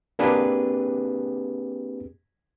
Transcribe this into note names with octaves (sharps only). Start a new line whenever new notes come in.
A#3 C4 D4 G4 G#4 B4